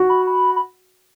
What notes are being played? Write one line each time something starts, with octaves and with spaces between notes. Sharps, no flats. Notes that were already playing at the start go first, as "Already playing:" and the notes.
Already playing: F#4
B5
B5
B5